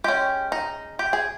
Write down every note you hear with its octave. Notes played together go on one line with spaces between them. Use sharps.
G#3 C#4 G4
D#4
G4
G#4